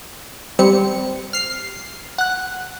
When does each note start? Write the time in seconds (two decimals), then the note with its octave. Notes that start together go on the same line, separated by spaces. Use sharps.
0.59 G3 C4 C#7
1.33 F6 C7
2.18 F#5 F#6